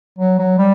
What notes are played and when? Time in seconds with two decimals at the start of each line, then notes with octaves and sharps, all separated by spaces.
0.19 F#3
0.39 F#3
0.59 G3